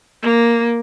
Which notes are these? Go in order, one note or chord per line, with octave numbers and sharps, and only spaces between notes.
A#3